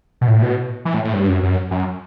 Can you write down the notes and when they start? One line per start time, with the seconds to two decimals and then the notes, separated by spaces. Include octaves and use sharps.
0.21 B2
0.28 A2
0.42 B2
0.85 E3
0.94 A2
1.04 A2
1.13 G2
1.28 F#2
1.43 F#2
1.71 F#2